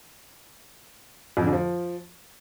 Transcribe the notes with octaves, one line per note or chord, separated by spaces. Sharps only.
F2
D3
F2
F3